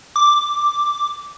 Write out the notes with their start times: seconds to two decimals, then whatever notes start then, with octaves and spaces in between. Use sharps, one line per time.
0.16 D6